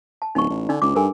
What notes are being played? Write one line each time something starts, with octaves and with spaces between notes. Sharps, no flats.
A5
D1 D#4 C#6
A1
D3 D4 D#4 D5
C#2 D6
G2 A4 A#4 G#5